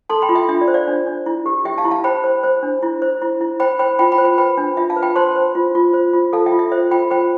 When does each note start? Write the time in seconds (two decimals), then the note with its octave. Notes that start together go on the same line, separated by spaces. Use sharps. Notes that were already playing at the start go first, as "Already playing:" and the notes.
0.09 A4 A5 C6
0.22 G5 B5
0.29 F4
0.35 E5 G5
0.48 D4 E5
0.61 D5
0.68 C5
0.74 D5 F5
0.88 D4
1.06 D4
1.26 E4
1.46 G4
1.65 G4 E5 G5
1.78 F5 A5
1.85 E4
1.91 F5 A5
2.04 C5 G5 B5
2.24 C5
2.43 C5
2.63 D4
2.82 E4
3.02 C5
3.22 E4
3.41 E4
3.60 C5 G5 B5
3.79 C5 G5 B5
3.99 F4 G5 B5
4.12 G5 B5
4.18 C5
4.24 G5 B5
4.38 B4 G5 B5
4.57 D4
4.77 F4 E5
4.90 F5 A5
4.96 B4
5.02 G5 B5
5.16 C5 A5 C6
5.36 C5
5.55 F4
5.75 F4
5.93 C5
6.13 F4
6.33 A4 F5 A5
6.46 E5 G5
6.52 F4
6.59 E5
6.72 C5 E5
6.91 F4 G5 B5
7.11 C5 G5 B5